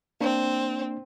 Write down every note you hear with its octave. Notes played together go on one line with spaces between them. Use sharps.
A#3 C4 D4